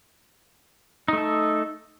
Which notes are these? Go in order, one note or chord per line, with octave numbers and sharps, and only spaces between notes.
A3 D#4 A4